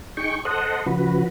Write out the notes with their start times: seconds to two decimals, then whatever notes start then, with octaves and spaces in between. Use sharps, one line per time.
0.17 D#4 G#4 G5 C#6
0.45 A4 C5 D#5 F#5
0.86 C#3 F3 F#4 B4